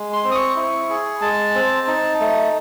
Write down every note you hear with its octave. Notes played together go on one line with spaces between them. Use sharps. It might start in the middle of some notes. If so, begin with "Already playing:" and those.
Already playing: G#3
C6
C4
D#6
C#6
E4
G#4
G#3 A5
C4
D#4
A3